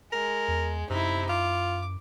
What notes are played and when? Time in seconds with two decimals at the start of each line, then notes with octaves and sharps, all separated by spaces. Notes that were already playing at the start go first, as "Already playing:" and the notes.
0.12 G#3 A#4
0.48 E2
0.90 F#2 C3 D#4 E4
1.29 F4 D6